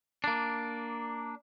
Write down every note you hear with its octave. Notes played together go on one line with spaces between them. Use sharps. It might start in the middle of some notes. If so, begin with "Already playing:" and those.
A#3 D4